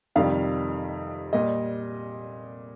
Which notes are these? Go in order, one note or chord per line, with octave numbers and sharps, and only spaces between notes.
F2 C3 D#3 G3 F5
A#2 G3 D#5